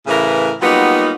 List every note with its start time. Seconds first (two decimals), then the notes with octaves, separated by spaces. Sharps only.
0.07 A2 C#3 E3 A#4 B4
0.61 F#3 G3 A#3 B3 D#4 F4